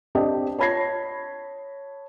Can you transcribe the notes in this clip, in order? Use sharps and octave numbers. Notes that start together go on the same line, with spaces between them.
C4 D4 G4 D5 D#5 G5
C#5 A5 B5 G#6 A#6 C7